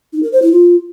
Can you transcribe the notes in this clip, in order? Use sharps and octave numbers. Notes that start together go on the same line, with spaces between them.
D#4
A#4
C5
E4
F4